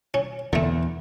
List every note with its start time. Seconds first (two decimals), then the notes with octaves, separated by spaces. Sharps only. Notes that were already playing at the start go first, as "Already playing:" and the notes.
0.14 C#4
0.53 E2 D3 A3